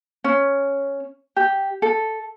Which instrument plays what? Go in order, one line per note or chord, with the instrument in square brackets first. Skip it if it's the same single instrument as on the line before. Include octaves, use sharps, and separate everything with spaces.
[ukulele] C#4
G4
A4